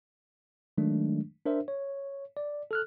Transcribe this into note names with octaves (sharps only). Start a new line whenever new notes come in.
D#3 F#3 G#3 A3 D4
D4 A#4 C5 E5
C#5
D5
A4 F6 F#6